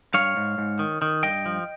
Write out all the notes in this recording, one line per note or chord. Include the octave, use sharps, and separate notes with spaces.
G2 C#5 F5
G#2
G#2
D#3
D#3
G2 D#5 G5
F3